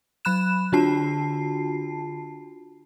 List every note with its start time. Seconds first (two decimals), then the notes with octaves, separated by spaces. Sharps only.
0.25 F#3 B5 F#6 E7
0.72 D3 D4 F4 F#4 A5 C7